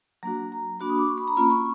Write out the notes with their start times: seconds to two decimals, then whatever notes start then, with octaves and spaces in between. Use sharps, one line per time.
0.23 F#3 A#3 D4 F#4 A#5
0.52 A#5
0.80 A#3 D4 F#4 B5
0.90 D#6
0.98 D6
1.08 C#6
1.18 B5
1.27 A#5
1.36 A#3 C#4 F4 B5
1.50 C#6